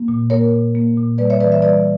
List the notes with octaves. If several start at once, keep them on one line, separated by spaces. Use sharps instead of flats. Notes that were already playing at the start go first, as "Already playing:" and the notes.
Already playing: A#3
A#2
A#3 A#4 C#5
A#2
A#3
A#2
G3 B4 D5
C#5 E5
E3 B4 D5
C#5 E5
G3 B4 D5